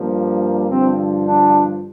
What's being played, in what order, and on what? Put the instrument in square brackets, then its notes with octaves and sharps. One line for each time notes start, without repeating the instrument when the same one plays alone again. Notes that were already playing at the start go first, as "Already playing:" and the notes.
Already playing: [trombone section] G2 F3 A#3
G2 D3 F3 C4
D4